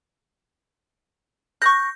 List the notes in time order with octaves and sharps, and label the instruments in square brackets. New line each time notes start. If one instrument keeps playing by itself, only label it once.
[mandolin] C#6 D#6 F#6 [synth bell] G6 A#6